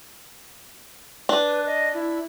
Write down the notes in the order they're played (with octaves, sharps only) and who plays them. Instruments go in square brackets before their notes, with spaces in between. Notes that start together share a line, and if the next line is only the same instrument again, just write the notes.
[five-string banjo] D4 [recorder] B4
[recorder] D#5
E4